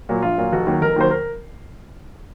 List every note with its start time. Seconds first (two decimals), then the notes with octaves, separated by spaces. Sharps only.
0.09 A#2 F#3
0.22 A#1 F4
0.38 A#2 F#3
0.52 F1 F#4
0.67 D#2 D#3 F#3
0.81 F1 A#4
0.96 D#2 D#3 F#3 C5
1.11 A#4